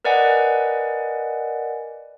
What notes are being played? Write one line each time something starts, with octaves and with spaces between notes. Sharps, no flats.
A#4 B4 D5 D#5 F#5 G#5